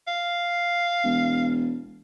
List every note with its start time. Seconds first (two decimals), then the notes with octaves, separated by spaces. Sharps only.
0.07 F5
1.04 E1